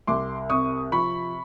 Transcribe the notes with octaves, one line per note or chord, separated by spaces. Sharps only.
C2 C6 D6
C3 C#6 D#6
F3 B5 C#6